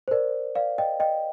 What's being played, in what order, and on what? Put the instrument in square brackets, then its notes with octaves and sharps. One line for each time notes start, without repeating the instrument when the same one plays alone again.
[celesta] C5
A#4 D5
D5 F5
D#5 G5
D#5 G5